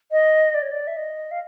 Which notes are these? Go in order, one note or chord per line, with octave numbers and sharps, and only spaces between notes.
D#5
D5
C#5
D5
E5
D#5
F5